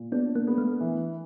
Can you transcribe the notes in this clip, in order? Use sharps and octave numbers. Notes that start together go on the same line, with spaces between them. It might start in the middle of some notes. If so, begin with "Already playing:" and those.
Already playing: A#2
B3 D4
A#3
B3
A3
E3